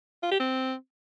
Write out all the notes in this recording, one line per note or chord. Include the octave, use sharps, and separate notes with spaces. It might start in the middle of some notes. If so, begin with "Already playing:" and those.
F4
G4
C4